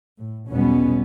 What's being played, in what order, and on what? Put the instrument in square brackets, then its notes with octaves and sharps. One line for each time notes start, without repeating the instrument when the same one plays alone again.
[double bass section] A2
B1 E2 B2 G3 B3 C#4